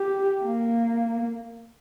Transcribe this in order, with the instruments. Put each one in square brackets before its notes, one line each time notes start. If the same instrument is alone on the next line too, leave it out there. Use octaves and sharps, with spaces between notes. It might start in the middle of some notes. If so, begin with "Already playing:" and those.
Already playing: [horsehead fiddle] G4
A#3